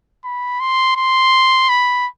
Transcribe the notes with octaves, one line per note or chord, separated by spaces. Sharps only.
B5
C6
C6
B5